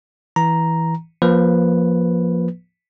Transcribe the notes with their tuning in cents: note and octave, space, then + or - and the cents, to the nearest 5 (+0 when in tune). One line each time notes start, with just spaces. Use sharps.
E3 -10 A#5 +5
F3 +0 A#3 +25 B4 +0